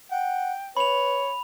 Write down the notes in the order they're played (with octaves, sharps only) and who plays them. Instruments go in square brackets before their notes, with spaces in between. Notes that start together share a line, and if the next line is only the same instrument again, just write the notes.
[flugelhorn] F#5 [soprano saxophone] G5
[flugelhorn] B4 [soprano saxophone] C#5 [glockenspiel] B5 F7